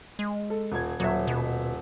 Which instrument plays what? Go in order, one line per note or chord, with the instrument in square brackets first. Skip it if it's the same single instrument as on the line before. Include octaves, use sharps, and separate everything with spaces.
[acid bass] G#3
[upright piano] A4
D#1 G#6
[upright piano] D#1 E5 [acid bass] F#3
[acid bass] B2